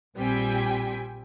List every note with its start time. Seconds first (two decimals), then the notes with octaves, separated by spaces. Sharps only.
0.17 A#1 G3 C4 G5 G#5 B6